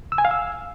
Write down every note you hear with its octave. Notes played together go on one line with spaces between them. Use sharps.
E6
G#5
F5
E6